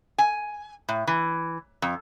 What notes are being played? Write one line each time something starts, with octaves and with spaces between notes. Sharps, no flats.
G#5
A2
E3
F2